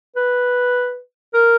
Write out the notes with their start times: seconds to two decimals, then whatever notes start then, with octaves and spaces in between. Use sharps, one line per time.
0.16 B4
1.34 A#4